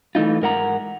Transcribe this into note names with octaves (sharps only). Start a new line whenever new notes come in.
E3 A3 C4 D#4 F4
G#2 A#4 F#5 A#5